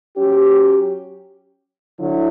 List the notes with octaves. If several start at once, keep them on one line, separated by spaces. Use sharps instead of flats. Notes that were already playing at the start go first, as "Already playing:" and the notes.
F#3 C#4 G4
D3 F#3 E4